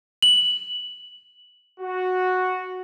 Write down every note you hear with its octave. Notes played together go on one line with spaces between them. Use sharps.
F#7
F#4